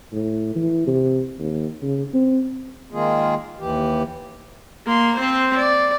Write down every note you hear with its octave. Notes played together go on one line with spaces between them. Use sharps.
A2
E3
C3
D#2
C#3
C4
D#3 G#3 A#3 F4 G#4
D#2 E3 G4
A#3 C6
C4 C5
D5